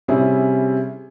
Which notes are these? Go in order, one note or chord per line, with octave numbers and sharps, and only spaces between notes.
C3 G3 C#4 E4 G#4